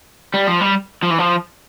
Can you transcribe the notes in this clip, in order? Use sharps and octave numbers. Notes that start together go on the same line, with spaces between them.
G3
F3
G3
F3
E3
F3